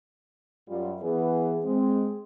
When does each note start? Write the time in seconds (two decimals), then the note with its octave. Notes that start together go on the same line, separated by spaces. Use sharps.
0.68 F#2 G3 F4
1.02 E3 B3 G#4
1.64 G#3 C4